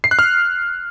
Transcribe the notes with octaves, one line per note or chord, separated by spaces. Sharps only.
C7
F#6
F6